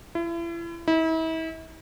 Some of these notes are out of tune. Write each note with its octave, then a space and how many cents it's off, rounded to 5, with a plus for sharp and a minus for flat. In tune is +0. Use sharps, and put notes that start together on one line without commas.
E4 +40
E4 -35